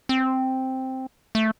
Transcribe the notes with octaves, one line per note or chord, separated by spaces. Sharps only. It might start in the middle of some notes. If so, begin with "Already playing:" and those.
C4
A3